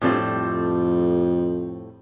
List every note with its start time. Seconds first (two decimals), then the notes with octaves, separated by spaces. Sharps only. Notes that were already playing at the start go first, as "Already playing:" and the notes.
0.01 F2 A2 G3 C4 F4 A4
0.11 G2
0.20 F2